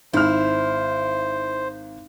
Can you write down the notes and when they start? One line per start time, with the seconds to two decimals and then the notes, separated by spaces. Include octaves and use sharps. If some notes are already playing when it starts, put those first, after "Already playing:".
0.13 G#1 E4 C5 F6